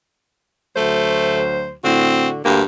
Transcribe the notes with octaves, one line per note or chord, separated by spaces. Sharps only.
D2 F#3 A3 C5
A2 D3 C4 F#4
D2 G2 A#3 G4